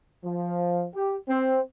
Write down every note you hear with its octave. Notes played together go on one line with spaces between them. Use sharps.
F3
G4
C4